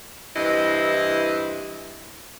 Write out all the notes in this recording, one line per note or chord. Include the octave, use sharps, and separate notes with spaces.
G2 E3 C4 E4 B4 D#5